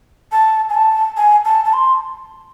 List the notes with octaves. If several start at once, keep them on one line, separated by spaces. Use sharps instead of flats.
A5
G#5
A5
G#5
A5
A5
C6